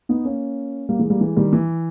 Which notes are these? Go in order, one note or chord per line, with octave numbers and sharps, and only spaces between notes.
B3 D#4
A#3 C#4
G3 A#3
E3 G#3
G3 A#3
E3 G#3
D#3 G3
E3